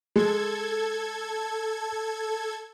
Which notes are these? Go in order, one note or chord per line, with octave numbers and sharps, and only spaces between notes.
G#3 A4 G#6